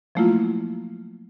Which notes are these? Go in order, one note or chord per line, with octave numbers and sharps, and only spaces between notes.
F3 F#3 A3 A#3 E4 F4